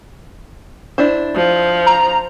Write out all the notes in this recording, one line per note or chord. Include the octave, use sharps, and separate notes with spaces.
D4 E4 C5
F3
A#5